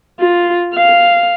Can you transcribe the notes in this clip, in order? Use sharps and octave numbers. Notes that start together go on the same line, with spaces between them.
F4
F5